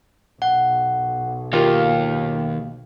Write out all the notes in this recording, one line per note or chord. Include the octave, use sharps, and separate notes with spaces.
B1 F#5
D#2 A#3 F4 G4 F5